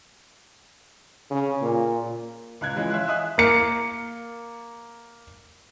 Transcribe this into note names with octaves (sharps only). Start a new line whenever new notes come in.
C#3
A#2
C#2 F#6 G#6
E3 F3 G#3 C#4
E5 F5 C6 F#6
D#5 E5 G#5 D#6 F#6
A#3 C#7